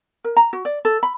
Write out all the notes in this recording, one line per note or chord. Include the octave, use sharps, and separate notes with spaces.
A#4
A#5
F#4
D5
A4
B5